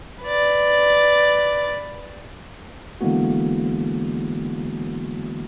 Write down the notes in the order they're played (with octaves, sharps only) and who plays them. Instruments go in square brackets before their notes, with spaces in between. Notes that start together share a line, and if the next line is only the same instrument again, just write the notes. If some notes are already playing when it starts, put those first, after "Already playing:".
[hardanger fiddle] B4 D5
[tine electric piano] D3 E3 G#3 A#3 B3 F#4